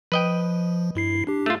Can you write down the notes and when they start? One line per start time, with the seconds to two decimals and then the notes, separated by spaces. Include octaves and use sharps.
0.12 F3 B4 D#5 G5
0.95 G2 E4 C7
1.27 D4 G4
1.46 A3 F4